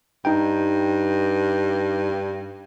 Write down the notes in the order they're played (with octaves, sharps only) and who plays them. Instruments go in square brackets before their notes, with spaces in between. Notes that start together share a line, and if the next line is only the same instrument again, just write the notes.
[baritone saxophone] G2 [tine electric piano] D#4 G5